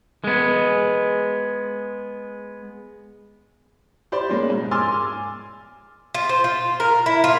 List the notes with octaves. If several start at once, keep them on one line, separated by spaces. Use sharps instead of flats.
G#3 B3
G4 C5 D5 B5 C6
B2 G#3 A#3 C#4
G#2
G#5 C6 D6 E6 F6 A6
F4
C5
F4
A#4
E4
F4